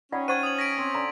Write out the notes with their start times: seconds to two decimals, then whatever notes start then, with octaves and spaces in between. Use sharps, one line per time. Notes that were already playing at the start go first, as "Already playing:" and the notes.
0.12 C#4 D#4 F4 D5 F#5 G5
0.28 C5 F#5 C#6 G#6 A6 D#7
0.43 D#6 F#7
0.59 A#6 B6 D7
0.78 C4 G#5
0.95 D3 A#5